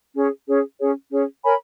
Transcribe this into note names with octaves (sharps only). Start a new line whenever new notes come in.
C#4 G#4 C#5
C#4 G#4 C#5
C#4 G#4 C#5
C#4 G#4 C#5
A#4 C#5 G#5 B5